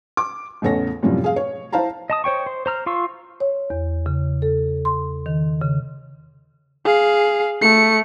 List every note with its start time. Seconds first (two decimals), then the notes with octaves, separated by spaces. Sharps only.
0.17 D6
0.62 A1 E2 C#3 A4 C#5 A#6
1.03 F#2 A2 C3 F3 G3
1.24 G#4 F5
1.36 C#5
1.72 E4 C5 F5 A5 A#5
2.10 D#5 A5 D#6
2.24 C5 C#5 G5 C#6
2.46 C5
2.66 C5 A#5 F6
2.86 F4 F5 C6 C#6 E6
3.40 C#5
3.70 E2
4.06 C#3
4.42 A4
4.85 C6
5.26 D#3
5.61 C#3
6.85 G#4 F5
7.62 A3 C#7